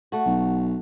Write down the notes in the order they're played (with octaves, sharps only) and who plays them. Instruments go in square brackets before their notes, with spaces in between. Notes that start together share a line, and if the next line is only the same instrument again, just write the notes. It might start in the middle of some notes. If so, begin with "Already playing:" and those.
[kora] A3 F#4
[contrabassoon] B1